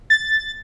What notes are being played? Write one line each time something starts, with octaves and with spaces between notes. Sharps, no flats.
A6